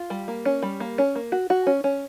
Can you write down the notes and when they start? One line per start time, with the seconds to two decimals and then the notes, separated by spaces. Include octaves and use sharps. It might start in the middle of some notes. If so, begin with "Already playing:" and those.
Already playing: F4
0.10 G3
0.28 A#3
0.45 C#4
0.62 G3
0.80 A#3
0.98 C#4
1.15 A#3
1.32 F#4
1.50 F#4
1.67 C#4
1.84 C#4